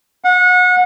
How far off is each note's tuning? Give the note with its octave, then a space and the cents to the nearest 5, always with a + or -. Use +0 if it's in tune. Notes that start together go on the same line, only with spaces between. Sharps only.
F#5 -30